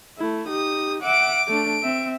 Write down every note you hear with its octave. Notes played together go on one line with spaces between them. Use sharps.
A3 E4
D#4 G4 D#6
E5 F#5 D6 D7
A3 D4 D7
C4 E5